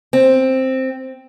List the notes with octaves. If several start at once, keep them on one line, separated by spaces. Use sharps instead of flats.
C4